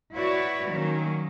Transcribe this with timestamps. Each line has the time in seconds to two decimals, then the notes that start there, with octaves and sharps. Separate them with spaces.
0.14 E4 F#4 B4 C#5 D5
0.69 D#3 F#3 A#3 C#4